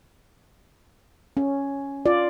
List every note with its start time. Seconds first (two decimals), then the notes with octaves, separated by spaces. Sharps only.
1.37 C#4
2.06 F4 D5